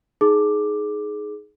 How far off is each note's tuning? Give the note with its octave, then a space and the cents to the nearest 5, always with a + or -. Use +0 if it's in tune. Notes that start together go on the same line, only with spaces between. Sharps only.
D#4 +5 G#4 +20 D6 +5